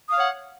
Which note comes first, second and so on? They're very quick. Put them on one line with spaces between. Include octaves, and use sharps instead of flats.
D#6 F5 C#5 F#5